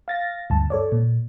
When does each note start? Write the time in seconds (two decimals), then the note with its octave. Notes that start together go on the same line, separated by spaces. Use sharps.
0.08 F5 A6 A#6
0.50 D2 G2 A5
0.70 A4 C#5 D5
0.92 A#2